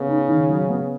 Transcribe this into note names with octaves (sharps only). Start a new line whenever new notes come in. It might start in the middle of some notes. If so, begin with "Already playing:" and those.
Already playing: C#3 B3
D#4
D#3
F#3
B3